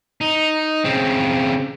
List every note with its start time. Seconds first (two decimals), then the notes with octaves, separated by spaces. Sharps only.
0.21 D#4
0.84 C#3 C4